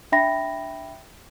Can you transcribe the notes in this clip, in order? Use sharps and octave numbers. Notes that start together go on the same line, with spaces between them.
D4 E5 G5 B5 A#6